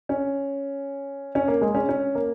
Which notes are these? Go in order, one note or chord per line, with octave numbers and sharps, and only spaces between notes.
C#4
C#4
A#3
G#3
C#4
C#4
A#3